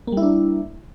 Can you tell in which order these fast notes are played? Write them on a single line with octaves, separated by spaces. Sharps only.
A#3 G3 E4 D4